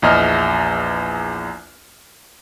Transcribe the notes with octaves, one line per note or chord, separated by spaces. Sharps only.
A#1 E2 D#5 F6